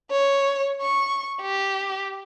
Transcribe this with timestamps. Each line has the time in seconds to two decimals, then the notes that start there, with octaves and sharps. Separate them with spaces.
0.11 C#5
0.82 C#6
1.42 G4